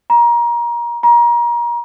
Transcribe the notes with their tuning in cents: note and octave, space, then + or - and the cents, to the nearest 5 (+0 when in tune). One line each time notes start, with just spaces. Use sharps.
A#5 +25
A#5 +30